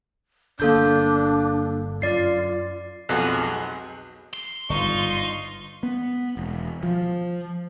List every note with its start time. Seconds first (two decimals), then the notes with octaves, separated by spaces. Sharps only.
0.60 G1 D3 A#3 D4 A4 G6
2.02 F#2 F4 D5 C7
3.09 B1 F2 G#3 B3 F#4 F#6
4.34 C6
4.70 G1 G#2 D#4 F4 C#6
5.83 B3
6.37 E1
6.83 F3